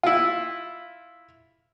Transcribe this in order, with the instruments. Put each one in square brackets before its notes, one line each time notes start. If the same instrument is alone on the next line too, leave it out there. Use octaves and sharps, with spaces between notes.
[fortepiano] E4 F4